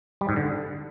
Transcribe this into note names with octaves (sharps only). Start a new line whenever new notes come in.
G3
G#2
D3